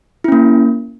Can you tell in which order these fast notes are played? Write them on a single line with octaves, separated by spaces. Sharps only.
E4 C#4 A#3